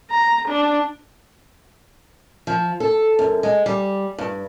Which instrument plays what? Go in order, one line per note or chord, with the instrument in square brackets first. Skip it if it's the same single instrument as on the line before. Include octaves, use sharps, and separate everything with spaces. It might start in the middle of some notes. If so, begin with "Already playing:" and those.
[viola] A#5
D4
[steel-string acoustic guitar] F3
A4
F#2
G#3
G3
G2